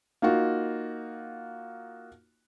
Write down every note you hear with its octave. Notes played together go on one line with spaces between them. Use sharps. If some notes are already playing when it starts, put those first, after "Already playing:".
A#3 D#4 F4 F#4